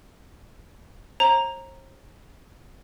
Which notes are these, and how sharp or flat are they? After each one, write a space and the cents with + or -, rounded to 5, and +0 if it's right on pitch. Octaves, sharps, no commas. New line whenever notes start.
C5 +45 A#5 +0